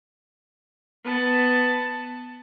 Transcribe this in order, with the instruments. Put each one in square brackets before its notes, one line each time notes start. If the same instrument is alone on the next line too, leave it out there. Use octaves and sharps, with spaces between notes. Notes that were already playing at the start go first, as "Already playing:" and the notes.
[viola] B3 A5